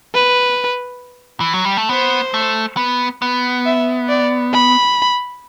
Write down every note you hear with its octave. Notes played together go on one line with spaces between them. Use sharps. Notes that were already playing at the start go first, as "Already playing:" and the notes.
B4
E3
F#3
G3
A3
B3 C5
A3
B3
B3
E5
D5
B5